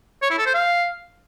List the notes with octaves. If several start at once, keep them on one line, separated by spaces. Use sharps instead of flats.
C#5
E4
A4
C5
F5